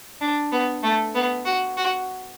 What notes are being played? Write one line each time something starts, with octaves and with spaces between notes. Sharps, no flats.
D4
B3
A3
B3
F#4
F#4